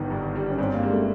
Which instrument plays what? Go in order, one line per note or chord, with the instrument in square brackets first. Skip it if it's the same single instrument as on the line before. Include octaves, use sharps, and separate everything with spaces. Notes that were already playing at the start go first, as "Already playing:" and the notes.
Already playing: [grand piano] G1 D#3 [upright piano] B3
[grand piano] G2
G3
[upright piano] C#4
[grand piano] G2 [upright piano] C4
[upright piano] A#3
[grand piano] G3 [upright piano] G#3
[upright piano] A3